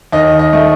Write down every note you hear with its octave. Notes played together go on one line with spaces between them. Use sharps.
D#2 D#5
D#5
A3